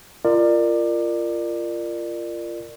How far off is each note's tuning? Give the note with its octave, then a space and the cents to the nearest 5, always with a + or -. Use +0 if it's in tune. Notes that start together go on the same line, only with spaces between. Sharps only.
F4 -20 A#4 -10 D5 +25